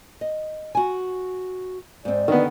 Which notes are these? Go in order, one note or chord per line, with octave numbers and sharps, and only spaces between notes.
D#5
F#4 G#5
G#2 C4 D5
D3 D#3 B3